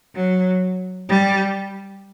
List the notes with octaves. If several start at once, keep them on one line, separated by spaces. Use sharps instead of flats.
F#3
G3